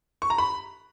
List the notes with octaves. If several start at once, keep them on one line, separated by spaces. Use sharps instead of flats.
C#6
A#5
B5